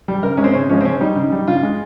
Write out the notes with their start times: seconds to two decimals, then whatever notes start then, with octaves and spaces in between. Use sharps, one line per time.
0.08 G3
0.23 C#3 A#4
0.37 G#3 C#4
0.44 C4
0.54 C#3 C#4
0.69 F3 G#3 C#4
0.81 C4
0.85 C#3 C#4
1.01 G3 D#4
1.16 C#3
1.32 G3
1.47 C#3 F4
1.63 G#3